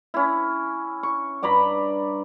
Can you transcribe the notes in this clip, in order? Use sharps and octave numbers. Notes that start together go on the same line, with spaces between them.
C#4 E4
C#6
G2 D5 A#5 B5